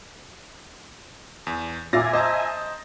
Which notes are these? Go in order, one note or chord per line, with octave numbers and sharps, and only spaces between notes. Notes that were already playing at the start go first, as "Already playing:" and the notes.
E2
A#2 E5 F5 G#5 D6 A6 A#6
C5 D#5 A5 A#5